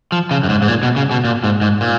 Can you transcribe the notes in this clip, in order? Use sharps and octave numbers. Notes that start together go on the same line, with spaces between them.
F3
C#3
F#2
G#2
G#2
A#2
B2
C#3
B2
A#2
G#2
G#2
A#2